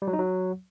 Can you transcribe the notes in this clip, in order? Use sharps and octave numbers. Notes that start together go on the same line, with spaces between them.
G3
F#3
D#4
F#3